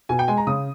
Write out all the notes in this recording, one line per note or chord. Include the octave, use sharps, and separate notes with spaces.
B2 G#5
G5
G#3 G#5
A#5
C#3 D#6